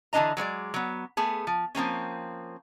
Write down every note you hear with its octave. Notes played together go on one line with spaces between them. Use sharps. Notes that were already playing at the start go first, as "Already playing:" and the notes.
D3 E3 G#3 D4 D#5 A#5
F#3 G#3 C#5 D5
F#3 B3
A3 B3 G#4
F3
F3 A#3 C4 C#4